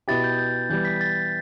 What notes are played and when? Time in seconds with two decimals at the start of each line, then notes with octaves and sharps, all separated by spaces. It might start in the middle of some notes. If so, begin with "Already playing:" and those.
0.08 B2 B3 E4 G4 A6
0.24 G6
0.38 G6
0.70 E3 G3 B3 G6
0.85 B6
1.01 A6